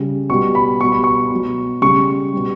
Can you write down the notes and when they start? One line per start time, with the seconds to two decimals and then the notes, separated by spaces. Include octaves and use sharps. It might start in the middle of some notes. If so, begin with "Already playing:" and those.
Already playing: C#3 G3
0.30 B2 G3 C#6
0.55 B5
0.80 B2 G3 C#6
0.92 B5
1.04 C#6
1.31 B2 F#3
1.82 C#3 G3 C#6
2.33 B2 G3